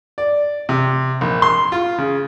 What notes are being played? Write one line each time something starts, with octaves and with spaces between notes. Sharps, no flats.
D5
C3
A#1
C6
F4
C#3